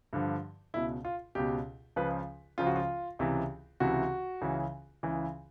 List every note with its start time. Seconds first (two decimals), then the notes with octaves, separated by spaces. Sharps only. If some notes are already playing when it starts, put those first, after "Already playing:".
0.13 G2 D3 F3
0.74 C#2 B2 E4
1.05 F4
1.35 C#2 B2 G4
1.96 C#2 C#3 F3 B4
2.58 C#2 C#3 F3 F4
2.67 F#4
2.76 F4
3.19 C#2 C3 E3
3.80 C#2 C3 E3 F#4
4.41 C#2 C#3 E3
5.03 C#2 C#3 E3